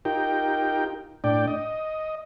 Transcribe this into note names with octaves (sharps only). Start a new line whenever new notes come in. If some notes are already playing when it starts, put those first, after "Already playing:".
D#4 F4 G4 A#4 G5
A2 D4 D5 G5
D#5